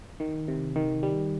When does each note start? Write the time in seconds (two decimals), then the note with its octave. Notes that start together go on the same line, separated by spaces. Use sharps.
0.20 D#3
0.48 C3
0.76 D#3
1.03 G3